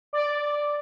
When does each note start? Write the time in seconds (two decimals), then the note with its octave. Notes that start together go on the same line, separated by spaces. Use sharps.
0.13 D5